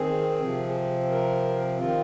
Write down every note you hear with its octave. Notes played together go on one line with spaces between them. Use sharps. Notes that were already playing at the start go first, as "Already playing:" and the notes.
Already playing: D#3 C4 G#4
C3 F3 C4
A#4
D#3 C4 F4